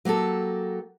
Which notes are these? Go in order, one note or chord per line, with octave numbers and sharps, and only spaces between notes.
F#3 A#3 G4 A4